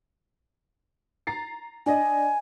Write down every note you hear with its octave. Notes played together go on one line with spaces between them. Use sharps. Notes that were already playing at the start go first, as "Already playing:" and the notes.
A#5 A6 C7
D4 D5 D#5 G#5